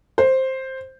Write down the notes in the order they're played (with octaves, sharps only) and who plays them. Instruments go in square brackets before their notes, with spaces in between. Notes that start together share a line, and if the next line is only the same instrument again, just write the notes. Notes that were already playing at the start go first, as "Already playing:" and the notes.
[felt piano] C5